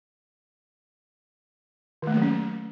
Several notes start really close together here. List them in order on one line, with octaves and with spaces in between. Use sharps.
D#3 A3 A#3 F#3 C#4